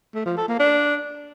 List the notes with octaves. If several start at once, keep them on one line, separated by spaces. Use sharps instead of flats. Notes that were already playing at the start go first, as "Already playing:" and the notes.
A3
F3
A4
A#3
D4